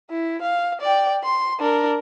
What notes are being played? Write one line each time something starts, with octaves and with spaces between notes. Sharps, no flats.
E4
F5
D5 G5
C6
D4 A#4